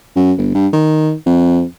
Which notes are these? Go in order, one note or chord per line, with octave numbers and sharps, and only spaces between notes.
F#2
G1
G2
D#3
F2